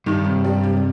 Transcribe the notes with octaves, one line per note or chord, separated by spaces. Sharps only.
G2 D#3
C3
G3
C3